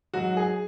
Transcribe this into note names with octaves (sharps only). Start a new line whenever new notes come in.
G#2 F#3 F#4
G#4